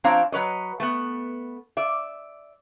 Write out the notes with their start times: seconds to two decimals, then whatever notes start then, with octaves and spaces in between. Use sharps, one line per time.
0.04 F3 C4 D4 C#5 F5 A#5
0.32 F#3 B4 C#5 D#5
0.80 A3 B3
1.77 D5 E5